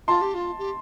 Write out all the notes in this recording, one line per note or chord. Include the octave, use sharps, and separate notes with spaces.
F4 A5 C6
G4
F4
G4